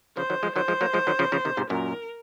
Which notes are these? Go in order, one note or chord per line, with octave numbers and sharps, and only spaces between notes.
C#3 F3 C5
D#3 F#3
F3 G#3
D#3 F#3 C5
F3 G#3
F#3 A#3
F3 G#3
D#3 F#3
C#3 F3
C#3 F3
C3 D#3
G#2 C3
F#2 A#2 A#4